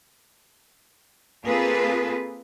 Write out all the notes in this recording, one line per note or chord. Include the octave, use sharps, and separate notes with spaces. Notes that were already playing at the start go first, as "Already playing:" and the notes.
A#3 C4 F4 G#4 A4 B4